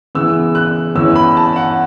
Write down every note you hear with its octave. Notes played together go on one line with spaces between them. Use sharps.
C#3 E3 B3 E6
F#6
E2 E3 C#4 E6
B5
A5
F#5